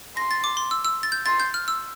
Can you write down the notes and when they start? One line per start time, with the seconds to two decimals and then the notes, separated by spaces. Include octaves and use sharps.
0.16 C6 A#6
0.31 A6
0.44 D6
0.57 C6
0.71 E6
0.85 E6
1.03 A6
1.12 G6
1.26 C6 A6
1.40 G6
1.54 F6
1.68 E6